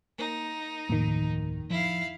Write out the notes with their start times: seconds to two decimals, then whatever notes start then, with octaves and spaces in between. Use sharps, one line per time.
0.19 A#3 D#4
0.89 D1 F2 A2 D#3 A#3
1.70 F3 E4 F5